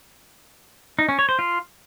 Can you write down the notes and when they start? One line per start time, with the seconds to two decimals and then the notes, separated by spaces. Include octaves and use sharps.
0.99 D#4
1.09 C#4
1.19 C#5
1.29 C5
1.39 F4